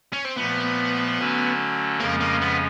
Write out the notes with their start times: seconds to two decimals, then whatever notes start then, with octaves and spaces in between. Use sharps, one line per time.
0.13 C#4
0.24 C4
0.36 A#2 F3 A3 B3
1.18 D3 F#3 A3 C#4 F#4
2.00 F2 C#3 F3 G#3 A#3 C#4
2.21 A#3
2.42 B3